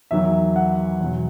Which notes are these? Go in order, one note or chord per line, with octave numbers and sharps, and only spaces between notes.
E2 D#3 F#3 E5
F#5
E2 B2 F#3